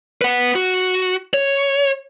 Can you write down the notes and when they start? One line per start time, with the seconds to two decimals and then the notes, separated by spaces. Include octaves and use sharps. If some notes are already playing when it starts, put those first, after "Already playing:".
0.21 B4 F#5
0.55 F#4
1.34 C#5